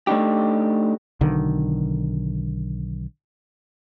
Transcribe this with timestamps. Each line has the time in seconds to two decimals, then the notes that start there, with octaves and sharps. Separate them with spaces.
0.07 A3 D4 D#4 G4
1.21 B1 D3 D#3